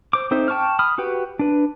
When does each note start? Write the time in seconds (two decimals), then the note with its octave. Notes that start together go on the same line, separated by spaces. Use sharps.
0.13 C5 D6
0.31 C4 D#4 A4 C5 E5
0.48 G5 A5 C#6 D6 F6
0.79 B5 D#6 F6
0.98 F#4 G4 B4 G5
1.39 D4 B4